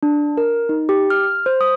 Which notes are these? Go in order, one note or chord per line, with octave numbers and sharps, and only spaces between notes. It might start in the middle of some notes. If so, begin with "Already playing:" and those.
D4
A#4
D#4
G4
F6
C5
D#6